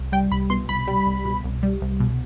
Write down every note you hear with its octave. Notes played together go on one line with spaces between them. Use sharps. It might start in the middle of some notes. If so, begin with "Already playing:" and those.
Already playing: C2
G3 G5
C2 B5
B2 C6
C2 B5
G3
C2
B2
C2
G3
C2
B2